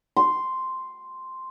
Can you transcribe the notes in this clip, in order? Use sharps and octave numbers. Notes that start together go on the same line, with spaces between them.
C6